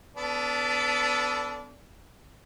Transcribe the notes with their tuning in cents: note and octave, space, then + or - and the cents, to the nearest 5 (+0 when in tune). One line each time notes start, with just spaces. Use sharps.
B3 +20 D4 -25 A4 +5